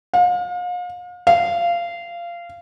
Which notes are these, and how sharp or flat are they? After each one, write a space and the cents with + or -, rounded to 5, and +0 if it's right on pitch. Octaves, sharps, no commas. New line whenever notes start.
F5 +40
F5 -20